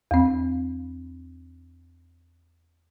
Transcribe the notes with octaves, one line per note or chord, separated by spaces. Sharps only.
E2 C4